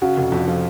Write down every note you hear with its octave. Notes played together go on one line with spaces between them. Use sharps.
C#3 F#4
F1
F2
F3